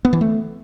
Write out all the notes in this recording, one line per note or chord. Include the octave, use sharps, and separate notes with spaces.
B3
E3
A3